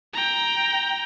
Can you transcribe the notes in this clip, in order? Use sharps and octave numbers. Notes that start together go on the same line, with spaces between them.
G5 A#5